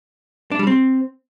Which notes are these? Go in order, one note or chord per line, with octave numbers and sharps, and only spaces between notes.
D4
G3
C4